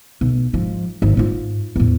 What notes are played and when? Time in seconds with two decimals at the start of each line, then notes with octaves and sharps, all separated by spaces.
0.21 B1
0.54 G#2 F3
1.02 G#1
1.17 G#2 F4
1.76 E2 A2